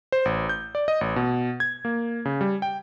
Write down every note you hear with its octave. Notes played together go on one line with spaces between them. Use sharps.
C5
A1
G6
D5
D#5
A1
B2
G#6
A#3
C#3
G3
G5